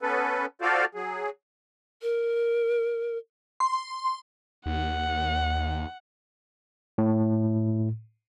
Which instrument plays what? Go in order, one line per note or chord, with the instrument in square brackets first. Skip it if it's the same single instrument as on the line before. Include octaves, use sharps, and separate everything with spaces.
[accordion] B3 C#4 A4 B4
F4 F#4 A4 C5 D5 F5
F#3 G#4
[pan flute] A#4
[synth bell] C6
[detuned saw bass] D#2 [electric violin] F#5
[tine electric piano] A2